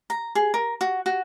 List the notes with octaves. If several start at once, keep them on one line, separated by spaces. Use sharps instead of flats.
A#5
G#4
A#4
F#4
F#4